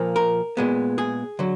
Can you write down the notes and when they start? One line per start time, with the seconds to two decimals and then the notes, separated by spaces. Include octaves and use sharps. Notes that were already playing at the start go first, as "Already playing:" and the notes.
Already playing: A#2 F3 A#3
0.16 A#4
0.57 A#2 G#3 B3
0.98 G#4
1.39 D3 F#3